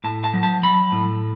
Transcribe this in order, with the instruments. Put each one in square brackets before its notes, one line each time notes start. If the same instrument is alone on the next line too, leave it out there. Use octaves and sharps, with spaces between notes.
[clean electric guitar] A2 A5
A5
F#3
A5
F#3 B5
A2